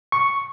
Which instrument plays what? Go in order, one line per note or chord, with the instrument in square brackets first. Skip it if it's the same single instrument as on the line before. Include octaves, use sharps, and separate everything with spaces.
[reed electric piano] C#6